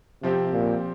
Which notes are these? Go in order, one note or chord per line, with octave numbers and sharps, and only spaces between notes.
C3 F3 C4 G4
A#2